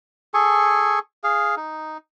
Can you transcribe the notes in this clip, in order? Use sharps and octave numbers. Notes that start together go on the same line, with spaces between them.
G#4 A4 G#5 C#6
G#4 F5
D#4